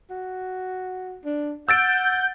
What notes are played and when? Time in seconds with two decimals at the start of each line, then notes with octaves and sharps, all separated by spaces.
0.10 F#4
1.25 D4
1.69 F#5 E6 G6 A6 D7